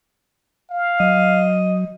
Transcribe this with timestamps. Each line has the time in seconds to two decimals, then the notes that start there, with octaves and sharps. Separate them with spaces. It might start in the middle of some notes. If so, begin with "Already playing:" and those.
0.71 F5
1.00 F#3 D#5